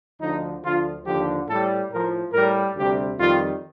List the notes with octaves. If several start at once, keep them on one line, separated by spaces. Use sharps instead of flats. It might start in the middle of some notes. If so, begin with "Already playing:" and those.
D2 D3 F3 D#4
D2 D3 F3 F4
D#2 D3 F3 G4
A2 G3 A4
A2 F3 A#4
A2 G3 A#4
D2 C3 G3 G4
F2 D#3 G3 F4